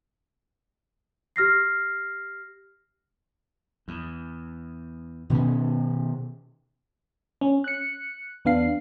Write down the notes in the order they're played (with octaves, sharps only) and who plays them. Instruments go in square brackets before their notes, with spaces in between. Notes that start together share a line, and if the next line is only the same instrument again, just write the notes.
[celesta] G4 F6 A#6 C7
[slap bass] E2
B2 D#3 B3 C#4
[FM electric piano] C#4
F#6 C#7
E2 B3 D4 F5 C7